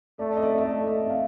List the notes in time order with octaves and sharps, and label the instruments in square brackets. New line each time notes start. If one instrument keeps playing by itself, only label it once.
[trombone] A3 [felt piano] D5
[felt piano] D#5
D5
E5
[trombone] A3 [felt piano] D#5
[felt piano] E5
F5